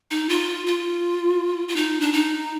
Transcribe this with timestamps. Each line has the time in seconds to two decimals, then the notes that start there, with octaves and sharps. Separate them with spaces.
0.11 D#4
0.29 F4
0.67 F4
1.68 F4
1.76 D#4
2.01 D4
2.13 D#4